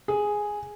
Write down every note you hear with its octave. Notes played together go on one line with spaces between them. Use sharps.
G#4